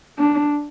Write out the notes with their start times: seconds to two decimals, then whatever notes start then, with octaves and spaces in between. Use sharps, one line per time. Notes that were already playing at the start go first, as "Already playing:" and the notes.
0.19 D4